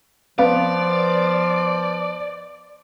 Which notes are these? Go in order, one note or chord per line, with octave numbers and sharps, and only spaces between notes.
F3 B3 D5 F5